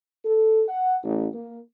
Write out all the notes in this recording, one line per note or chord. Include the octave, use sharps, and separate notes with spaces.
A4
F#5
A1
A#3